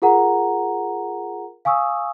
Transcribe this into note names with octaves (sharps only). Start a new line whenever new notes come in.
F4 G#4 A#4 F#5 A#5
F5 G#5 C#6 D#6 E6